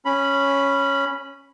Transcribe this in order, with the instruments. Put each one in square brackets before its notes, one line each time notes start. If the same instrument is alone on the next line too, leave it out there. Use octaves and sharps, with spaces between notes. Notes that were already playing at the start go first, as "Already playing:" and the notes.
[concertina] C#4 B5